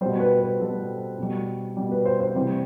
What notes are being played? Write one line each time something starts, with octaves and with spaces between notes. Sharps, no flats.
B2 G3 C5
B4
B4
B2 G3 A4
B2 G3
B2 G3
B4
C5
C5
C3 E3 G3